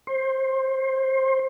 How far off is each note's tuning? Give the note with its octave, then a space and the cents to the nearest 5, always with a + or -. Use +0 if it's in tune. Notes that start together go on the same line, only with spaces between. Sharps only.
C5 +20